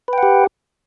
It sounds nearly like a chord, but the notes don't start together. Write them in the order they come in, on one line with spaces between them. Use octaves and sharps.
B4 G5 F#5 G4